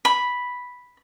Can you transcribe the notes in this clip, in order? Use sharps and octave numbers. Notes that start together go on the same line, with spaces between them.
B5